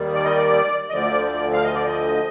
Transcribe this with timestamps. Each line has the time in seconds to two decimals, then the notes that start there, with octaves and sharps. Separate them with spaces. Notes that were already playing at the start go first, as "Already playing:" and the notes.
Already playing: D#2 D#3 G3
0.13 D5
0.25 D#5
0.36 D5
0.89 D#5
0.93 D2 D3 F3 D5
1.33 D5
1.53 F5
1.64 D#5
1.75 D5
1.86 D#5